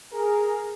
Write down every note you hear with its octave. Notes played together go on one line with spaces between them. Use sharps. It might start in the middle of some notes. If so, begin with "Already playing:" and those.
G#4 A#4